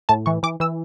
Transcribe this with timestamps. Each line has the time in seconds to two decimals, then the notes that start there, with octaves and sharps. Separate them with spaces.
0.09 A2 A5
0.26 E3 C#6
0.43 E3 D6
0.60 E3 E6